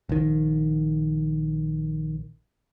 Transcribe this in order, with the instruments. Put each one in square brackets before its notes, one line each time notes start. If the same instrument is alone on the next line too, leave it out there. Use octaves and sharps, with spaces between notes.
[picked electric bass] A#1 D#3